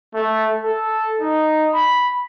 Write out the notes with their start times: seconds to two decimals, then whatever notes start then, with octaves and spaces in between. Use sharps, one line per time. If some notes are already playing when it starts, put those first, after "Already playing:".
0.14 A3
0.64 A4
1.21 D#4
1.74 B5